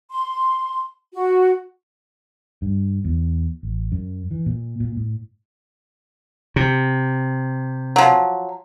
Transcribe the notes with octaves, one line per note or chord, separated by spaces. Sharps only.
C6
F#4
G2
E2
A1
F#2
E3
A#2
A#2
A2
C3
F3 F#3